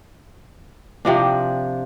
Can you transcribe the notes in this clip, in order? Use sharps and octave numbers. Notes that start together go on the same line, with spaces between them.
C3 F3 D4